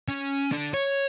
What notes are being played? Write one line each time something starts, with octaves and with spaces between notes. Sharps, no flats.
C#4
D3
C#5